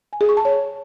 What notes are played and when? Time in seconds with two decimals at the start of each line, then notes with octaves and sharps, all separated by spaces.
0.13 G#5
0.21 G#4
0.29 C#6
0.37 A5
0.45 C#5